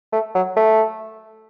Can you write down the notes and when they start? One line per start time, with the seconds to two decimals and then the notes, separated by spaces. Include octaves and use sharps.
0.12 A3
0.35 F#3
0.57 A3